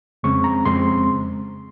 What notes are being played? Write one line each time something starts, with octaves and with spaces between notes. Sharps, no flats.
F2 C#3 G#3 C4 C#6
A#5
F2 C#3 G#3 C4 C6